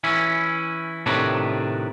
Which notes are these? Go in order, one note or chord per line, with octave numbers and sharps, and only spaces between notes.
E3 C#4 E4
A2 C3 D#3 D4 B4 C#5